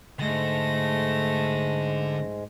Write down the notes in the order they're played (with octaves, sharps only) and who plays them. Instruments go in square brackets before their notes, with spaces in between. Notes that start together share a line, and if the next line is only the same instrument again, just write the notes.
[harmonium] G#2 G#3 [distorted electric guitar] D3 [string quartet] A3 A#6